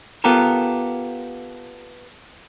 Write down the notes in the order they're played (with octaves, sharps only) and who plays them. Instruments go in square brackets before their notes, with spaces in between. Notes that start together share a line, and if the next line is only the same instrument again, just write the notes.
[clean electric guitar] B3 F4 G4 A4 A#4